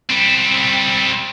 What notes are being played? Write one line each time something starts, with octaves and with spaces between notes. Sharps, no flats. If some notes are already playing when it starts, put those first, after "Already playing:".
G3 C4